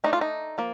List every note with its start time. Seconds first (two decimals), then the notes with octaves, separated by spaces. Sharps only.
0.04 A3 D4 D#4
0.13 F4
0.21 D#4
0.58 F3 A#3